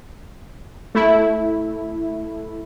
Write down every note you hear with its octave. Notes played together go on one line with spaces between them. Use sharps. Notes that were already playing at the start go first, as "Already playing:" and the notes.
A3 E4